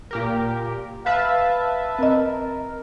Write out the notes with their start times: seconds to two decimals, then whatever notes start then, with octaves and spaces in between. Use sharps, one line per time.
0.11 A#2 G4 A#4
1.06 B4 E5 F5 A5
1.99 C4 A#4 D#5